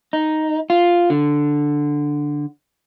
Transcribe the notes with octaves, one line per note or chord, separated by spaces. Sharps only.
D#4
F4
D3